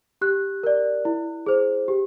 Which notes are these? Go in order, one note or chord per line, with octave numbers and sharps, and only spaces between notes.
G4 F#6
A#4 D5
E4
G#4 C5
G4